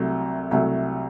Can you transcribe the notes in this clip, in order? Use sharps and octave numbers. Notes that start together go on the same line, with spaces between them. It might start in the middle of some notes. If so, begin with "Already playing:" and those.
Already playing: C2 C3 F#3 A3
C2 C3 F#3 A3